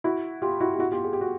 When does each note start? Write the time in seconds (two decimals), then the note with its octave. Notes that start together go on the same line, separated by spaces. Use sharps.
0.04 E4 F#4
0.42 F4 G4
0.60 E4 F#4
0.73 G4
0.79 E4 F#4
0.92 F4 G4
1.04 G#4
1.13 G4
1.21 F#4